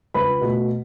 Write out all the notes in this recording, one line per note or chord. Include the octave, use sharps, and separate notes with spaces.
C#2 B4 B5
B2 A3